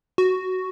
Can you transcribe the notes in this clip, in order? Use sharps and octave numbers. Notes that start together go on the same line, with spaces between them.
F#4